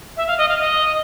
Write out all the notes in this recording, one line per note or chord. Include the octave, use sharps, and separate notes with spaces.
E5
F5
D#5
F5
D#5